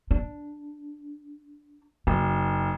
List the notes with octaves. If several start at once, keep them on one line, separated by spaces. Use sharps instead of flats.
D4
F#1 D#4